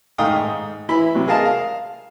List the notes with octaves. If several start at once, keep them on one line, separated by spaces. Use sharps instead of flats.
G#2 D#3 A3 F5 G5 D#6
G#2
E3 E4 B5
C3 F#3
G#4 A#4 D#5 F5 A5
F5